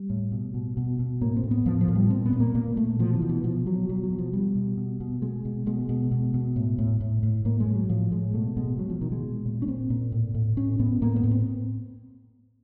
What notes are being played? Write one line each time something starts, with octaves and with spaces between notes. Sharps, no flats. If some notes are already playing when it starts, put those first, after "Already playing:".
Already playing: G3
A2
B2
B2
B2
B2
A2 A#3
C4
A2
B3
A2 F3
F3
A2
G3
A#2 C4
B3
A#2
A#3
A#2 A#3
A#2 A3
B2 F3
E3
B2
E3
B2 F3
B2 F#3
B2 F#3
F#3
B2
F3
B2 G3
B2
B2
B2
B2 G#3
B2
B2 G#3
B2
B2
B2
A2
A2
A2
A2
A2 A#3
G#3
A2
F#3
A2 F3
A2 G#3
B2 A3
B2 G#3
B2 F#3
F3
B2 D#3
G#3
A#2
A#2
C#4
A#2 C4
A#2
A2
A2
A2 C#4
A2 B3
A2 A#3
B3
A2
C4